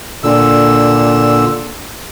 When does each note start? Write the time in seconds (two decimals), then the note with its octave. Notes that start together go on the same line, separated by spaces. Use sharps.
0.24 A#2 D3 E6